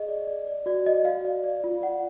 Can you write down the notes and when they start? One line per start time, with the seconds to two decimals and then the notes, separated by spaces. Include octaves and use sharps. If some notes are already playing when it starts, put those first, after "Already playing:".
Already playing: G#4 D#5
0.08 D5
0.27 D5
0.47 D5
0.66 F#4 D5
0.85 D5 D#5
1.05 F#4 F5
1.25 D5
1.44 D5
1.64 F4
1.82 D5 F#5